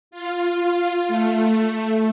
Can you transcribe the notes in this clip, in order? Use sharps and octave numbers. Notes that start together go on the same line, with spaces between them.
F4
A3